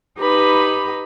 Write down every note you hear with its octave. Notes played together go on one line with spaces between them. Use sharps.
D#4 G4 B4 B5